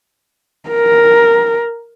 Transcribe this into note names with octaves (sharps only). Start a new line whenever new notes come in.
A#4